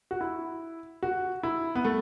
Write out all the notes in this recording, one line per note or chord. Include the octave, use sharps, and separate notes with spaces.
F#4
E4
F#4
E4
B3
A3